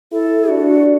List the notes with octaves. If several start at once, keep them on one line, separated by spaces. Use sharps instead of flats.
E4 A4
D4 F#4